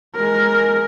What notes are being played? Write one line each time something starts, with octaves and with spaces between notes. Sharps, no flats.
G#3 A#4